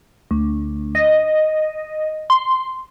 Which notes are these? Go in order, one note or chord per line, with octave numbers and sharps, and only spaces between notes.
D2
D#5
C6